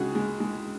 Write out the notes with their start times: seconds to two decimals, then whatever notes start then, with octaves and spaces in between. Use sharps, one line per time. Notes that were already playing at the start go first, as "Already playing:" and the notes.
Already playing: C#2 G#3 F#4 G#4
0.15 G#3
0.40 G#3